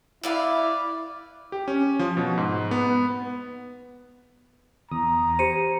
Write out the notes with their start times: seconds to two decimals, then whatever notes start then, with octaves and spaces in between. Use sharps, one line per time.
0.23 E4 B4 D5 F5
1.52 G4
1.68 C#4
1.99 F3
2.17 B2
2.38 G#2
2.71 B3
4.91 E2 A#5 D#6
5.39 G4 C5 C#7 D#7